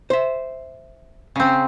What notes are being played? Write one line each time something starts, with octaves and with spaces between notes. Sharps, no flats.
C5 E5
C#3 C4